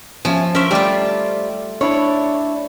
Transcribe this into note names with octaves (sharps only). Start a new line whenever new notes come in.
F3 C#4 E5 G#5
C#4 A#4 C5 E5
G3 A3 F4 D5
D4 E4 C#5 D5